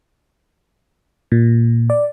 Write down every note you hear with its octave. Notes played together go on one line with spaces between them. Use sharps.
A#2
D5